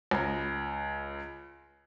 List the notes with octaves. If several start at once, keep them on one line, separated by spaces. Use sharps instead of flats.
C#2 A#5